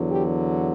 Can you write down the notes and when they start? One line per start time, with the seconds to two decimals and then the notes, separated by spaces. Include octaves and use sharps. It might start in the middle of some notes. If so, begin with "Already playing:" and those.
Already playing: E2 D3 F#3
0.11 G4